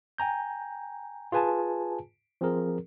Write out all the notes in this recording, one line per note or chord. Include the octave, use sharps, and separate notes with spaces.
G5 G#5 A#5 G6
F4 G#4 B4 G#5 A5
F3 C4 G#4 A#4